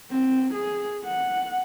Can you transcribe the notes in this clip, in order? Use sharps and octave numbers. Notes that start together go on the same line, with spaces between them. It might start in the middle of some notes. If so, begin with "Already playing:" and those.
C4
G#4
F#5